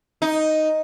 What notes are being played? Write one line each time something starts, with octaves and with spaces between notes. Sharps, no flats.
D#4